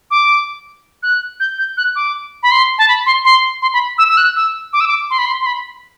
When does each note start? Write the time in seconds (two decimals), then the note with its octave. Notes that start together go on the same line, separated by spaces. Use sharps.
0.11 D6
1.03 F#6
1.40 G6
1.58 G6
1.77 F#6
1.96 D6
2.43 B5
2.51 C6
2.78 A5
2.88 B5
3.06 C6
3.25 C6
3.62 C6
3.73 B5
3.98 E6
4.09 E6
4.17 F#6
4.36 E6
4.73 D6
4.80 E6
4.88 D6
5.10 C6
5.18 B5
5.26 C6
5.41 C6
5.46 B5